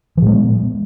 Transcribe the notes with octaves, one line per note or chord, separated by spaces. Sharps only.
A#2 F3 G#3 B3